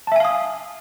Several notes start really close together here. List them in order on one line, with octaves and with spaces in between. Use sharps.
A5 E5 G#5 F5 D#6